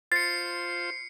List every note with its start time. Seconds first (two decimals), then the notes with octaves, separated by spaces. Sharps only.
0.12 F4 C5 A6 C7 C#7